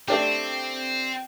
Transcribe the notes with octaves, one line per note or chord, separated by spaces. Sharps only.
A3 C4 D4 G4